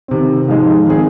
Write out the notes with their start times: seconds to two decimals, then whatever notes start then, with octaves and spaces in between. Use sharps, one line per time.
0.08 C3 D#3 C4
0.48 G#2 F3 G#3 D#4
0.86 D#3 C4 G#4